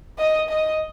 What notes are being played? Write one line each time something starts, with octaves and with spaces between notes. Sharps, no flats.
D#5
D#5